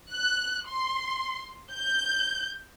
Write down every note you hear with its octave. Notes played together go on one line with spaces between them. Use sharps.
F#6
C6
G6